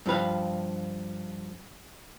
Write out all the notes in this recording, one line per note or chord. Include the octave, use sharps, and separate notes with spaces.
G2 F3 B4 F5